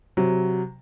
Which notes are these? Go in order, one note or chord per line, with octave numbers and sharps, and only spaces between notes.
C3 F#3